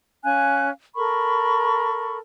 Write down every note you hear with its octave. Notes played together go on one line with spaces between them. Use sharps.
C#4 F5 G#5 F#6
A4 A#4 B5 C#6